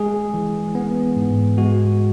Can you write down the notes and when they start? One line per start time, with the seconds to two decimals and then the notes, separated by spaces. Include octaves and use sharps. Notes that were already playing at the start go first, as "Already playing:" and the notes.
Already playing: G#3 G#4
0.34 E3
0.75 B3
1.16 G#2
1.58 G#3 F#4